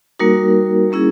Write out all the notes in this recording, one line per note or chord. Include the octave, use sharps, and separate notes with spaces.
G3 A#3 D#4 F#4 A#4
G3 A#3 C#4 E4 G#4